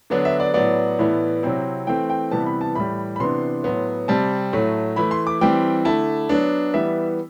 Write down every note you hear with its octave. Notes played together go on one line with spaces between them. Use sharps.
D3 F#3 B3 D4
E5
D5
A2 F#3 B3 D5
A2 E3 B3 E4
C3 F#3 C4 E4
E3 A3 C4 G5
G5
C3 E3 G3 B3 A5
B5
A5
A2 E3 G3 B5
B5
C3 E3 B3 D4 C6
A2 F#3 B3
C3 G3 C4 A5
A2 F#3 A3
E3 A3 E4 B5
C6
D6
E3 G3 C4 G5
D3 A3 E4 A5
F#3 B3 D4
E3 G3 B3 E5